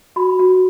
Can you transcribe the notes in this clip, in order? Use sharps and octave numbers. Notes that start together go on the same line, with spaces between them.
F#4 B5
F#4